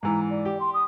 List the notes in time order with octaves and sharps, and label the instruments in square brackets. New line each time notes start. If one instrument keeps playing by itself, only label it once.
[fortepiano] G#2 E3 [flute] A#5
[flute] D5
[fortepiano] G4
[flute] C6
D#6